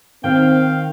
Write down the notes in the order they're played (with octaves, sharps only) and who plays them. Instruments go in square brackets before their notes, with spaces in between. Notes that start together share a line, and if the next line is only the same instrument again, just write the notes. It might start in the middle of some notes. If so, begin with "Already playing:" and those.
[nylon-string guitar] D#3 [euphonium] C4 [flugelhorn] F5 [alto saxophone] G5